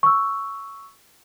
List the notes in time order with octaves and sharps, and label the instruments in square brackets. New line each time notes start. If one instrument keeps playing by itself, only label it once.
[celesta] C#6 E6